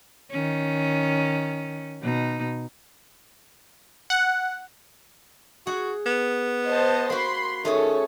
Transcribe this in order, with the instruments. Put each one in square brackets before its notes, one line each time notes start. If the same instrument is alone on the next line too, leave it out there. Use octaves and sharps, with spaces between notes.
[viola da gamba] D#3 C#4
B2 D#4
[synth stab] F#5
[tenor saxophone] F#4 [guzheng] G#4 F#5
[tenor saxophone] B3
[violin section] C5 D#5 A5
[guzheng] A#3 F#4 [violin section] B5 C6
[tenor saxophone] D#3 [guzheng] A3 C#4 G#4 [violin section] A4 C#5